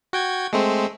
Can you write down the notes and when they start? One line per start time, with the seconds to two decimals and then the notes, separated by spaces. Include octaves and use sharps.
0.13 F#4 G5 G#6
0.53 G#3 A3 C4